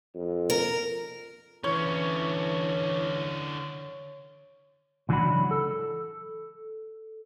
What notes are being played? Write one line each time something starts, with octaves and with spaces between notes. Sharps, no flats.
F2
A#4
D3 E3 C#4 C#5
C#2 E3 F#3 D4 F#4 B5
A4